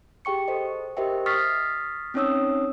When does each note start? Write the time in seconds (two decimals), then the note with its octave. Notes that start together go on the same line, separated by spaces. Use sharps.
0.25 G4 G#4 G5 C#6 C#7
0.48 A4 C5 D#5
0.97 G4 A#4 C5 D#5 E5 G5
1.26 C#6 D#6 F6 A6 B6 C7
2.14 C4 C#4 D#4 C#5 D#6 E6